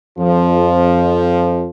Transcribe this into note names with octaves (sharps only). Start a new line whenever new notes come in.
F2 F3